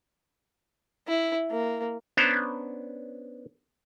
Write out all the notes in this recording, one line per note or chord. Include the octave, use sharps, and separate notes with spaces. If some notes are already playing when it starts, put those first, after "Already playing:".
E4
A#3
B3 C#4 D4 C5 A5 A#5